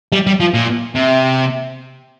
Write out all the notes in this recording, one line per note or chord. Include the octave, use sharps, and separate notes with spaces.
G3
G3
F3
A#2
C3